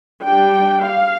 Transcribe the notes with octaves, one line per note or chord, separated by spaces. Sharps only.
G3 D4 G5
F5